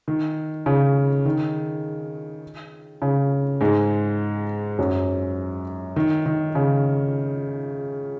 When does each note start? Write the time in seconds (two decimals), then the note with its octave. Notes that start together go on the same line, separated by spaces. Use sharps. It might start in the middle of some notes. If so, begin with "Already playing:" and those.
0.08 D#3
0.66 C#3
1.26 D#3
3.02 C#3
3.61 G#2 G#3
4.79 F#2 F#3
5.96 D#3
6.26 D#3
6.55 C#3